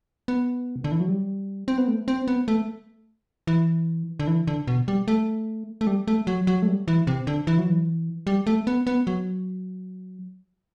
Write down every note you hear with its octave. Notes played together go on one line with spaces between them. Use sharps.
B3
C3
D3
E3
F#3
G3
C4
B3
A3
C4
B3
A3
E3
D3
E3
D3
B2
G3
A3
A3
G3
A3
F#3
F#3
A3
G3
E3
C3
D3
E3
F#3
E3
G3
A3
B3
B3
F#3